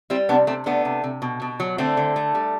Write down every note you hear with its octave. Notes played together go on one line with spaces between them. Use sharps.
G3 C4 E4
C3 B3 D4
C3 A3 C4
A3 B3 D4
C3
C3
B2
B2
F#3
D3 A3 C4
D3
A3
G3